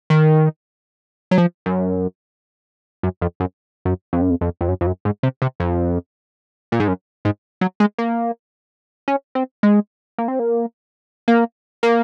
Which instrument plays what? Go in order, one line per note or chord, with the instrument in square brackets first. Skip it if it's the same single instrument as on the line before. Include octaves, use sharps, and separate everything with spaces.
[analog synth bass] D#3
F#3
F3
F#2
F#2
F2
F#2
F#2
F2
F#2
F2
F2
F2
F#2
F2
F#2
G#2
C3
C3
F2
A#2
G#2
F#2
G#2
F#3
G#3
A#3
C#4
C4
G#3
A#3
C4
A#3
A#3
A#3